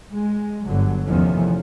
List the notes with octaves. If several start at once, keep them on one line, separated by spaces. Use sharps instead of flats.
G#3
G1 D3 F#3
E2 C3 D#3 F3 A3 C#4